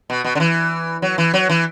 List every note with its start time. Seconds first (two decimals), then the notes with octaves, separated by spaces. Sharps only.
0.10 B2
0.25 B2
0.35 D3
0.40 E3
1.02 F#3
1.18 E3
1.34 F#3
1.50 E3